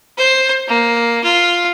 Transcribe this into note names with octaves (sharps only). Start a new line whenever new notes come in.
C5
A#3
F4